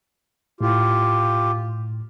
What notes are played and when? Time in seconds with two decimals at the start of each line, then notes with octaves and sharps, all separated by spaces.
0.61 A2 F4 G4